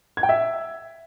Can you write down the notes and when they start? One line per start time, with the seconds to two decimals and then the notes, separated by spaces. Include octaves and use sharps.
0.17 G#6
0.23 G5
0.29 E5